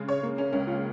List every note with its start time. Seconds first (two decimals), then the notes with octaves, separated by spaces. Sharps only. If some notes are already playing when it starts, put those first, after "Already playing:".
Already playing: C#3 G#3
0.09 C#5
0.23 A#3
0.38 C#4
0.52 C#2 C#4
0.67 F4